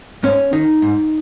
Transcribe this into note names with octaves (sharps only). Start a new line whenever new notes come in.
G#2 C#4
D#3 D#4
G#2